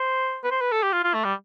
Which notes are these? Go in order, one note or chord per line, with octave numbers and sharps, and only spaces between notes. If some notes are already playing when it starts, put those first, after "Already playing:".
Already playing: C5
B4
C5
B4
A4
G4
F4
F4
A3
G3